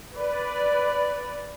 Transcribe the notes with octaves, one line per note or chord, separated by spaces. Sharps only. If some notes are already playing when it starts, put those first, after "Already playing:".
B4 D5